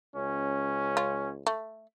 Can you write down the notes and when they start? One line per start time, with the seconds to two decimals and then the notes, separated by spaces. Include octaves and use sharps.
0.16 C#2 C#4
0.97 F4
1.47 A3